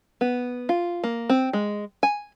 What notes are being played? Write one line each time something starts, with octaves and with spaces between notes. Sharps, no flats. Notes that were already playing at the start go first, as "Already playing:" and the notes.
B3
F4
A#3
C4
G#3
G#5